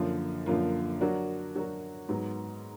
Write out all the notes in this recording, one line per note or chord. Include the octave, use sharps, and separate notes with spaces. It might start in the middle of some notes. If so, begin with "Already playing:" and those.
Already playing: F#2 D3 F3 A#3 F4
F#2 D3 F3 A#3 F4
F#3 D4 F#4 A#4
F#3 D4 F#4 A#4
G#2 F#3 B3